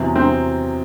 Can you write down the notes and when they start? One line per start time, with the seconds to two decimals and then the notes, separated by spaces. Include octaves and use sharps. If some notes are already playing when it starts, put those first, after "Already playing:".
Already playing: E2 C3 F#3
0.16 C4